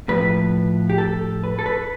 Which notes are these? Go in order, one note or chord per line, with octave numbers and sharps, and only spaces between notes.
A2 F3 B4
G4
A4
B4
A4
B4